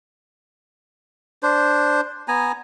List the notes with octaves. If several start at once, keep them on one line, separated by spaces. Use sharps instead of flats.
D4 C5
B3 G#5 A#5